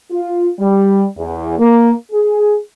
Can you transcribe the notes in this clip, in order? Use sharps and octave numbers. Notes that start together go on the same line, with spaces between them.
F4
G3
E2
A#3
G#4